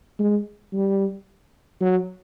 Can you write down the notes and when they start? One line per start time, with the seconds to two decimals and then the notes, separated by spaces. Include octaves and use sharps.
0.20 G#3
0.73 G3
1.81 F#3